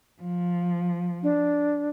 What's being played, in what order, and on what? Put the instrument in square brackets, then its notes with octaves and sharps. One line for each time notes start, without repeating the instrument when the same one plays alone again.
[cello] F3
[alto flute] D4